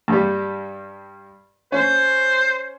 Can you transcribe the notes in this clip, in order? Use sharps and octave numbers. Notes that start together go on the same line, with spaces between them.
G2 G3
C#4 C5